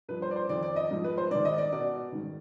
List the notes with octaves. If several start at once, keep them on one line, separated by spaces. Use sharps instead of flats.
G2 F3 B4
C5
D5
C5
F2 D#3 D5
D5
D#5
G#2 F3
B4
C5
G#2 D#3 D5
D#5
D5
B2 D5
G#2 D#3